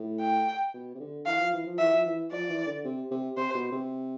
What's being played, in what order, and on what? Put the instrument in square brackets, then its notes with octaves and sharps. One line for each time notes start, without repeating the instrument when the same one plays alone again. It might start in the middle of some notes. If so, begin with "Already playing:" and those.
Already playing: [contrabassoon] A2
[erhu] G5
[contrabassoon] B2
C3
D3
[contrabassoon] E3 [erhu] F5
[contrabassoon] F3
E3
F3
[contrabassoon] E3 [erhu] E5
[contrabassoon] F3
E3
[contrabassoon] F3 [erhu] D5
[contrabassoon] E3
D3
C3
C3
[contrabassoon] C3 [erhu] C5
[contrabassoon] B2
C3